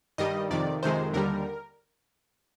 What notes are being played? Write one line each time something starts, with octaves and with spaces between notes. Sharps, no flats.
G2 D#3 G3 D#5
F2 C3 D#3 D5
F2 C3 D#3 G#3 C5
D#2 D3 G3 A#4